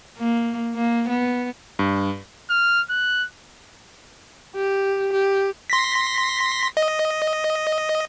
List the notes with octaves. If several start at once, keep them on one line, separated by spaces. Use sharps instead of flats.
A#3
A#3
B3
G2
F6
F#6
G4
G4
C6 A#6 B6
D#5